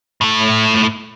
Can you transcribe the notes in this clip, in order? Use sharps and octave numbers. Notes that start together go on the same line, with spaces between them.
A2 A3